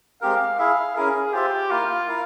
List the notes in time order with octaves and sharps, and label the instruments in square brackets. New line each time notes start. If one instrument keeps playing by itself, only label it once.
[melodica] G#3 C4 G4 A#4 [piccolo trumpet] F5
[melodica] E4 G#4 E5 [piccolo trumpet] F5
[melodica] C#4 E4 A#4 [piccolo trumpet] G#4
[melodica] F4 C5 E5 [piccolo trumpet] G4
[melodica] A#3 E4 A#4 [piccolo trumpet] F4
[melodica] E4 A#4 F5